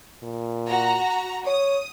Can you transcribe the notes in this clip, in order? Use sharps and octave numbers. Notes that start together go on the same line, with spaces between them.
A#2
F#4 A#5
C#5 D#6